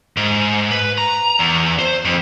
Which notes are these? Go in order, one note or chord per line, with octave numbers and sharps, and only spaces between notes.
G#2
B4
A#5
E2
C5
F2